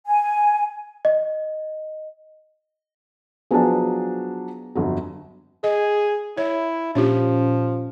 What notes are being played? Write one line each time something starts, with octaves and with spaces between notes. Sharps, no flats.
G#5
D#5
F3 F#3 B3 D4 G#4
G1 F2 F#3
G#4 D#5
E4 C#5
A#2 F3 C#4 D4 F4 G4